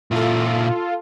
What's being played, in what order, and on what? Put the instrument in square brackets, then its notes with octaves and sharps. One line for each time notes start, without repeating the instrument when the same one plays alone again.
[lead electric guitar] A#2 E4 [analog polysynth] F4 A4